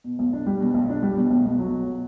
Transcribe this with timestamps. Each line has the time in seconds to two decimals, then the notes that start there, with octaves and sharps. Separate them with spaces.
0.04 B2
0.19 B1
0.33 D4
0.46 G3
0.60 B2
0.74 B1
0.89 D4
1.03 G3
1.17 B2
1.31 B1
1.45 B1
1.59 F#3
1.73 B2